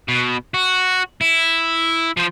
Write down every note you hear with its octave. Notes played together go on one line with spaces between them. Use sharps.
B2
F#4
E4
F3 C5